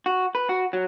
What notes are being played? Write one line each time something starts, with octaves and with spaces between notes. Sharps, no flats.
F#4
B4
F#4
F#3